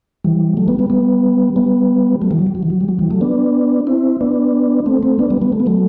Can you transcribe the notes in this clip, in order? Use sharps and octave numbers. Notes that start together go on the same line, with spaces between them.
E3 G3
F#3 A3
G3 B3
G3 B3
G3 B3
G3 B3
F#3 A3
E3 G3
F#3
G3
F#3
E3
F#3
G3
F#3
E3 G3
F#3 A3
B3 D4
C4 E4
B3 D4
A3 C4
A3 C4
B3 D4
G3 B3
G3 B3
A3
B3
F#3 A3